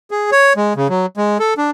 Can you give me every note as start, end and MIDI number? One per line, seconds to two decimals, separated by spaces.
0.11 0.30 68
0.32 0.53 73
0.56 0.73 56
0.76 0.88 49
0.89 1.06 54
1.17 1.38 56
1.39 1.54 69
1.58 1.71 62